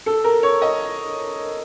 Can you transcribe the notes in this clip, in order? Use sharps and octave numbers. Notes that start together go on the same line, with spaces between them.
A4
A#4
C#5
D#5